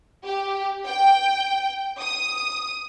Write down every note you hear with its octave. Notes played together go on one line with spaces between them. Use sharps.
G4
G5
D#6